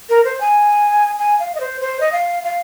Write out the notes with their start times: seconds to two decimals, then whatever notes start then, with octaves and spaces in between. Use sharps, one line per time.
0.10 A#4
0.25 C5
0.41 G#5
1.19 G#5
1.39 F5
1.55 D#5
1.60 C5
1.81 C5
2.00 D#5
2.12 F5
2.44 F5